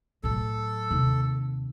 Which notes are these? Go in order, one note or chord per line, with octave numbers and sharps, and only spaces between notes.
A2 F#3 A4
D#2 C3